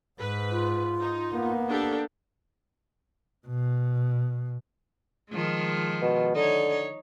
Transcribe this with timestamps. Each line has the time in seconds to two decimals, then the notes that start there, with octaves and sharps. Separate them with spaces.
0.20 G#2 B4
0.51 F4
1.00 D#4
1.33 A#3 B3
1.68 D4 G4 A4
3.47 B2
5.30 D#3 F3 G#3
6.02 B2
6.36 D3 D#4 C#5